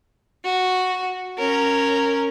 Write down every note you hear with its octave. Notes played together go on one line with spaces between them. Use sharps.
F#4
C#4 A#4